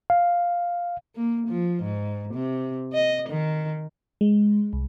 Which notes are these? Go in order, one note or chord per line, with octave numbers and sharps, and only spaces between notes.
F5
A#3
F3
G#2
C3
D#5
D#3
G#3
C2